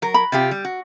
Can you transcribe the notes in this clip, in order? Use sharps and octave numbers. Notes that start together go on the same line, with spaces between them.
F#3 A#4
B5
C3 F4 G4
G3
F#4